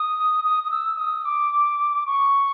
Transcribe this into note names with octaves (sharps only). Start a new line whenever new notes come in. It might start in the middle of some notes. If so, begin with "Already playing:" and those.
Already playing: D#6
D#6
D#6
E6
D#6
D6
C#6